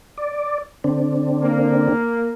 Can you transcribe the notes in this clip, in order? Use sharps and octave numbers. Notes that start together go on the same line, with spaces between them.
D5
D3 C4 D4
A#3